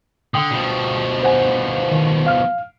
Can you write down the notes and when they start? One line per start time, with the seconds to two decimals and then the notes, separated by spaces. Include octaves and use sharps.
0.34 D3 G5 D#6
0.51 B2 F3
1.23 C5 F#5 G#5
1.92 D#3
2.27 F5 F6